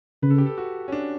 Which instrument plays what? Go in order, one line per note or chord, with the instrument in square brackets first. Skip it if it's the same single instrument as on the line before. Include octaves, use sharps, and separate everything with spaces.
[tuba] C#3 [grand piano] B4
[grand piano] A4
G4
A4
F#4
C#4
D4